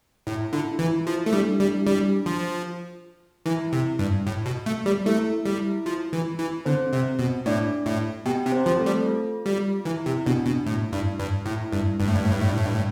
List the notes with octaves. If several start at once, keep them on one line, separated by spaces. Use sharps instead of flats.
A2 E4
D3 F4
E4
E3 F4
F3 E4
A3
G3 D4
D4
G3 E4
G3 D4
F3
E3 E4
C3
G2
A2
B2
A3
G3
A3 E4
E4
G3
E4
F3
E3
E3
D3 C4 C5
C3
B2
A2 D4 D5
A2
B2 G4 G5
C3
C4 C5
F3
A3 A4
G3
F4
G3 F4
E3 E4
C3
B2 D4
B2
A2 E4
G2
G2
A2 E4
G2
G2
A2
G2
A2
G2
A2
G2
A2
G2
A2